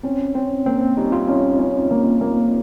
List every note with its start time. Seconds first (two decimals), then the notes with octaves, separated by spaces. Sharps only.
0.03 C4 C#4
0.34 C4 C#4
0.66 A#3 C4
0.81 C4
0.97 G3 D#4
1.12 F4
1.28 C#4
1.59 C#4
1.91 A#3
2.21 A#3